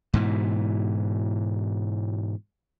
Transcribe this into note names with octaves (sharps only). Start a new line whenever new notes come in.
G#2 B2 E3